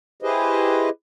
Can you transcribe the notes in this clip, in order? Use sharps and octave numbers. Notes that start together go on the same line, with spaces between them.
E4 G4 G#4 B4 C5 D#5